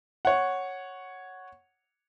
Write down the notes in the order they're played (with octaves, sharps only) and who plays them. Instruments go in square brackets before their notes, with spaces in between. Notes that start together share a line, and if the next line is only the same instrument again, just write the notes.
[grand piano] C#5 F#5